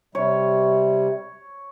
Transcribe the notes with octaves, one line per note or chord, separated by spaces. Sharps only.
C3 G3 C#5